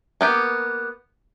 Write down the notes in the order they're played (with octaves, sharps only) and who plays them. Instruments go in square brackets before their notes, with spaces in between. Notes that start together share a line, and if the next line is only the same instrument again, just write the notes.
[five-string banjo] A#3 B3 G4